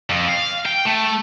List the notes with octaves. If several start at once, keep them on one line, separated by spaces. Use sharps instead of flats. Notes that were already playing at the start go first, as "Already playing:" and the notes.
F2
F5
G5
A3